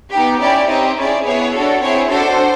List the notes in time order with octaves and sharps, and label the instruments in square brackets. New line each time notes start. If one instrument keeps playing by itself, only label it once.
[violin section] B3 D#4 G4
C#4 E4 G4 D5
C4 D#4 G4 D#5
C#4 E4 G#4 D5
B3 E4 G#4 C#5
D4 F#4 A4
C4 E4 G#4 C#5
D4 F#4 A4 C5